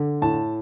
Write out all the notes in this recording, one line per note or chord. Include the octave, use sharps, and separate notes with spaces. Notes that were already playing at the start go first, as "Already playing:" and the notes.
Already playing: D3
A2 A5